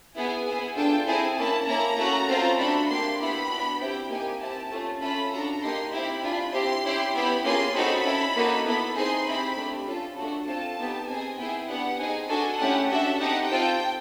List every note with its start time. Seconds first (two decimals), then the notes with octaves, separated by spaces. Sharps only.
0.16 B3 E4 G#4 G#5
0.45 B3 E4 G#4
0.76 D4 F4 A4 G5
1.06 C4 E4 G#4 G#5
1.37 A#3 C#4 E4 A5
1.67 A#3 C#4 E4 A4 A#5
1.97 A3 C#4 F#4
2.28 A3 C4 F4 A4
2.58 A3 D4 F#4 A4 B5
2.89 A#3 D4 G4 C6
3.20 B3 E4 G4 B5
3.49 B3 D4 F#4
3.79 C4 E4 G4 G5
4.10 A#3 D#4 G4 G#5
4.40 C4 E4 G4 A5
4.71 A3 C#4 F4
5.01 A3 C#4 F4 A4 B5
5.31 D4 F#4 A4 A#5
5.61 A#3 D#4 G4 C6
5.93 C4 E4 G4 B5
6.22 D4 F4 G#4
6.52 C4 E4 G4 C6
6.84 C#4 E4 G4
7.13 B3 E4 G4 B5
7.44 A#3 C#4 F4 G#4 C6
7.74 C4 D#4 F#4 A4 B5
8.05 C#4 E4 A4
8.35 A#3 D#4 F#4 A4
8.65 B3 E4 A4 B5
8.96 C4 D#4 G#4 C6
9.26 C4 E4 G4 B5
9.56 A3 D4 G4
9.87 C#4 F4 A4
10.17 A3 D4 F#4 A4
10.47 C4 F4 A4 A5
10.78 B3 D#4 G4
11.08 C4 D#4 G#4 G#5
11.38 B3 E4 G#4 G5
11.69 B3 D4 G4 F#5
11.99 C4 D#4 G#4 G#5
12.29 D4 F#4 A4 G#5
12.59 A3 C#4 E4 G4 F#5
12.90 D4 F#4 A4 E5
13.20 C4 D#4 G4 F#5
13.50 C4 F4 A4 G5